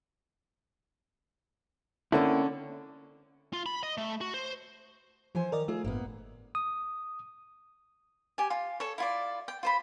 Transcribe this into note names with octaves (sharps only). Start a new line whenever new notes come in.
D3 A#3 C4 C#4 E4
F4
B5
D#5
A3
F#4
C5
E3 F3 C5 G#5
D#3 A#4 D5 D#5
A3 F4 G#4
G1 A2 A#3 B3
D#6
G4 G#5
F4
A4 C#5
E4 F4 D5
G5
F4 C5 B5